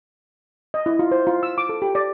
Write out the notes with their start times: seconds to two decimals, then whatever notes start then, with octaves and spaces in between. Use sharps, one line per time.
0.74 D#5
0.86 E4
0.99 F4
1.11 C5
1.27 F4
1.43 E6
1.58 D6
1.69 A4
1.82 G4
1.95 D5